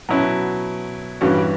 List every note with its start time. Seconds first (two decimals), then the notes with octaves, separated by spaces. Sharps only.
0.09 B2 F#3 C#4 E4
1.21 G2 E3 G3 C#4 F#4